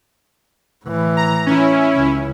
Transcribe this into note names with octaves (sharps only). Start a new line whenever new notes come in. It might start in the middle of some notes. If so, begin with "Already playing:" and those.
A2 E3
A#5
C#4 E4
C#2